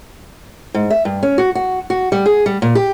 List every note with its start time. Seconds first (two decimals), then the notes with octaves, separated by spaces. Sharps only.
0.75 G#2
0.90 E5
1.05 G2
1.23 C#4
1.38 F#4
1.55 F#4
1.90 F#4
2.12 G3
2.26 G#4
2.46 G3
2.62 A#2
2.75 G4